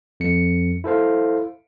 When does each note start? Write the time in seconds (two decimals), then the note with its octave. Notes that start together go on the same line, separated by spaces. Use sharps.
0.20 F2 C#7
0.84 E4 A4 C5 F5